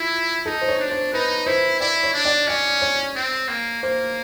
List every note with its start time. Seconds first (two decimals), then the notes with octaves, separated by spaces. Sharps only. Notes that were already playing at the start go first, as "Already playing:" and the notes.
Already playing: E4 F4
0.46 D#4 A4
0.61 C5
0.68 C#5
0.79 D4
0.91 C5
1.13 D#4 B4
1.46 E4 C5
1.80 E4 D5
2.03 C#5
2.14 D4
2.25 D5
2.47 C#4 D5
2.82 C#5
3.16 C4
3.48 A#3
3.82 A#3 C5